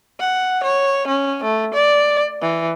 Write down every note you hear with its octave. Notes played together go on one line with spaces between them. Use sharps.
F#5
C#5
C#4
A3
D5
E3